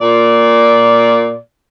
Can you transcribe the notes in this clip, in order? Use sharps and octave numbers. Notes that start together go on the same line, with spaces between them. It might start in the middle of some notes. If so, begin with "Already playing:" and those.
A#2 D5